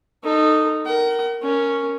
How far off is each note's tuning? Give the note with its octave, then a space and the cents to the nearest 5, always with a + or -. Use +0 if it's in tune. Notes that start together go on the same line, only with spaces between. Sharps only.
D#4 -10 A4 +15
A#4 +0 F#5 +45
C#4 +0 A#4 +0